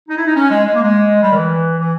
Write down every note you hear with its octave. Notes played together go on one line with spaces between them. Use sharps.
D#4
E4
D#4
C#4
G#3
G#3
A#3
G#3
G3
D#3
E3
E3